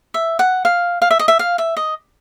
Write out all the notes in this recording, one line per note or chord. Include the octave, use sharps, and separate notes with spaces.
E5
F#5
F5
F5
E5
D#5
E5
F5
E5
D#5